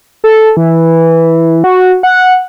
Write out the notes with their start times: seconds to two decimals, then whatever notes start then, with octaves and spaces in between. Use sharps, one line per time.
0.24 A4
0.57 E3
1.64 F#4
2.03 F#5